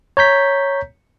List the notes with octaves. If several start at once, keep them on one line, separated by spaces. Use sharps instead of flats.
C#5 A#5 G6 B6